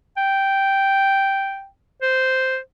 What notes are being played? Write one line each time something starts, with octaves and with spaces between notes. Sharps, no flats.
G5
C5